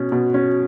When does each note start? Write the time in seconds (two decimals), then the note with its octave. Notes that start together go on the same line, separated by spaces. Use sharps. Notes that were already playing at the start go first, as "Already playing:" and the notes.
Already playing: B2 C#4
0.12 B2
0.34 C#4